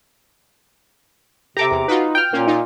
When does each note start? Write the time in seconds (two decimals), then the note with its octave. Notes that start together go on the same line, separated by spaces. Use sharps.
1.57 C3 G4 A4 E5 A#5 D6
1.71 E2
1.88 D#4 F4 F#4 B4
2.15 G5 F6
2.33 A#2 A#3 C#4
2.47 D#4 F4